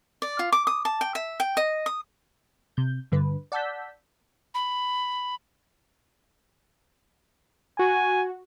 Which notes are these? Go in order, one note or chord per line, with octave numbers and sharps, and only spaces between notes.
D5
F4
D6
D#6
A5
G5
E5
G5
D#5
D#6
C3 G6
G2 D3 B4
D5 F#5 A5 E6 G6 B6
B5
F#4 G#5